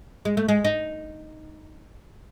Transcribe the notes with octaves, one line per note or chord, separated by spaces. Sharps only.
G#3
A3
G#3
D#4